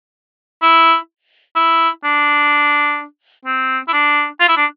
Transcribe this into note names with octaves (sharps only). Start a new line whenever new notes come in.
E4
E4
D4
C4
E4
D4
F4
E4
D4